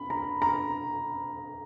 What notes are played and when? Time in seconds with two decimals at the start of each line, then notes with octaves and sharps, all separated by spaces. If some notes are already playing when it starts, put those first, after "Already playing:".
Already playing: B5
0.10 A#5
0.42 A#5